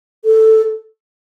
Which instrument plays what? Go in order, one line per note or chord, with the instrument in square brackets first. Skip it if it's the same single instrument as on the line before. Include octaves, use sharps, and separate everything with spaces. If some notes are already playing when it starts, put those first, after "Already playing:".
[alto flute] A4